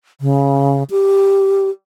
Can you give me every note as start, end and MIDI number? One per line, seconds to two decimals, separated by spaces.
0.21 0.83 49
0.91 1.70 67